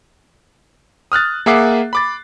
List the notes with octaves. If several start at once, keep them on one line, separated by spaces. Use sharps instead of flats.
D#6 F6 F#6 A6
A#3 G#4 E5 F#5 D6 C7
B5 D6 A6